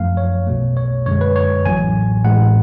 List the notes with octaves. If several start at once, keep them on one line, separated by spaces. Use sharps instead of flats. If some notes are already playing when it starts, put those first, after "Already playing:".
Already playing: F#2 F3 A3 F5
C#5
B1 B2 A3
C#5
F#2 D3 G#3 C#5
B4
C#5
A1 A2 F#3 G#5
A1 A2 G#3 F#5